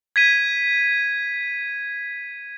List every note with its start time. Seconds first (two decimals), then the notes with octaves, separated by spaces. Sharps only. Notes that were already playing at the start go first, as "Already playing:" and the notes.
0.16 G#6 B6 D#7